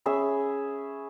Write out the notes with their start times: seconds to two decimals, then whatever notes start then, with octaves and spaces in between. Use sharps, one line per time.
0.06 C#4 G#4 E5 B5